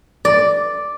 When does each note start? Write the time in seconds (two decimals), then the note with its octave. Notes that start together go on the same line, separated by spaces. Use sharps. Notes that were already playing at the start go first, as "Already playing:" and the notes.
0.25 D5